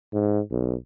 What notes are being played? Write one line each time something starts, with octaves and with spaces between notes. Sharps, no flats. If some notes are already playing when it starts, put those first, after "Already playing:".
G#2
B1